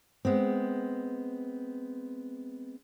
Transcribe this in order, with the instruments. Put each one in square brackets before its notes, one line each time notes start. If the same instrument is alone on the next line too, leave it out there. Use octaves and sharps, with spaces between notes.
[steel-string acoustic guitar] G#3 B3 C4